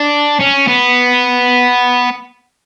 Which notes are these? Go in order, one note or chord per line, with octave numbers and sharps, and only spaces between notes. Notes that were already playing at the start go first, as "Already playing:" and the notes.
Already playing: D4
C#4
B3